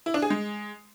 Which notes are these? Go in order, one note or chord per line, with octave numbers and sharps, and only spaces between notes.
E4
D4
G#4
G#3